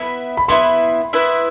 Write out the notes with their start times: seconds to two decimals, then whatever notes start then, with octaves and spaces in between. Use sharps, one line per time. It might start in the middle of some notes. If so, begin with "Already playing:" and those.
Already playing: B3 E4 B4 E5 B5
0.37 B5
0.48 B3 E4 B4 E5 C6
1.13 B3 E4 B4 E5